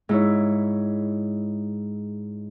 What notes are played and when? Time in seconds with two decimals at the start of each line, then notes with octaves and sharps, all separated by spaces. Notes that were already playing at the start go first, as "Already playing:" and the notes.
0.09 G#2 E4 C#5